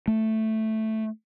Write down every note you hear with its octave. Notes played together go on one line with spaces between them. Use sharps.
A3